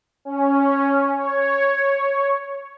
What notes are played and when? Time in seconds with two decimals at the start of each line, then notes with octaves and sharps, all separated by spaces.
0.25 C#4
1.14 C#5